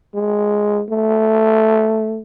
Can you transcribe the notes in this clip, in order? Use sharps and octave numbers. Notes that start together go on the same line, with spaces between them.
G#3
A3